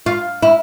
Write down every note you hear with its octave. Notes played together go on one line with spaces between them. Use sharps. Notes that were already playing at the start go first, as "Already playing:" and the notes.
F4
E4